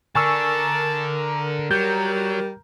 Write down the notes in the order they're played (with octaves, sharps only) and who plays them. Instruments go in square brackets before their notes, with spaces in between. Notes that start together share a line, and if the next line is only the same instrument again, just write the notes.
[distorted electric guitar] D3 [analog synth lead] A#4 [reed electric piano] G#5 C#6 E6 [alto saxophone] A5
[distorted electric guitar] F#3 [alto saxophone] G3 [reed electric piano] G6